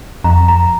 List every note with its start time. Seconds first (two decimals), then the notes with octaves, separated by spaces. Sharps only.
0.24 F2 A#5
0.48 A#5